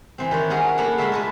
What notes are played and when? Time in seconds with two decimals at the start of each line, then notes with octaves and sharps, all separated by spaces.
0.18 E3 C4
0.31 D#3 D4 C#5
0.50 C#4 F#4 G#4 A#4 C#5
0.78 A3 A#3 D4 E4 A4 F#5
0.98 G#3 D4 G#4 A4 E5 F5
1.12 F4 A4 B4